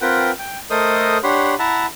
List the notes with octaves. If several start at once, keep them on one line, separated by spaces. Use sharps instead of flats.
C4 F4 A#4 B4 F#5 G5
G5
A3 A4 A#4 C5 D#5 D#6
D4 G4 C#5 F#5 B5 C6
E4 E5 F#5 A5 A#5